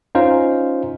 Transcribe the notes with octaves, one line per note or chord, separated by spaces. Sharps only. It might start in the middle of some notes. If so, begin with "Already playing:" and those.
C#4 D#4 F4 C5 F5